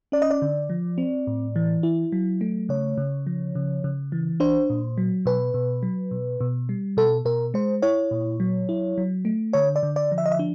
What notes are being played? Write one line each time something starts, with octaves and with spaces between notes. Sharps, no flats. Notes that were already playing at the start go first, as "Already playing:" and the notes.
C#4 D5
D#5
D5
D3
F3
C4
A2
E3
E4
F#3
A3
C#3 C#5
C#3
F3
C#3
C#3
E3
D4 C5
A#2
F#3
B2 B4
B2
F#3
B2
B2
G3
B2 A4
B2 A#4
G#3 C5
E4 C#5
A#2
F#3
E4
F#3
A3
D3 C#5
D5
D3
D5
F3
E5
D#5
E5
D4